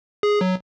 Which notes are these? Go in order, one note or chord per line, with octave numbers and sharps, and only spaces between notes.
G#4
F#3